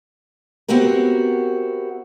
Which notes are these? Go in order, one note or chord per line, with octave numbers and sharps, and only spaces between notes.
B3 C4 E4 F#4 G4 A#4